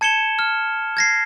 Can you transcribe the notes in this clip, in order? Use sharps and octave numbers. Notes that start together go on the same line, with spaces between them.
A5 G#6 C#7 E7 G7
F6
G#6 A#6 C7